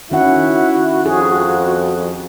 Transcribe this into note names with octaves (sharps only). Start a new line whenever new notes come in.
D#3 C#4 E4 F#4 F#5
F2 G#4